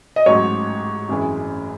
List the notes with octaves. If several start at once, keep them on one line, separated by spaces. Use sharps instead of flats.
D#5
A1 G#2 F#3 C#5
G#1 F#2 E3 G#3